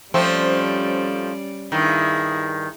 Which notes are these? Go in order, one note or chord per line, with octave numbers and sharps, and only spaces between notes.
F3 G3 A3 C4 C#4 D5
G2 D#3 E4 G#4